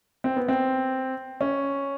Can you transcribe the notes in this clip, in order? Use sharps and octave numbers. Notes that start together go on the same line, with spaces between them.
C4
B3
C4
C#4